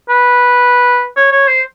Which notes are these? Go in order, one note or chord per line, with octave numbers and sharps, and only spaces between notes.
B4
C#5
C#5
C5